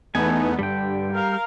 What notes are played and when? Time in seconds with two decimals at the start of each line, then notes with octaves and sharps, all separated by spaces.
0.15 E2 A3 B3 D#4 G#5
0.59 G2 D3 G3 G5
1.13 A#4 F5